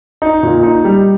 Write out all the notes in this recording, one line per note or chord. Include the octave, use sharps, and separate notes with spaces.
D#4
A#2
D#4
G3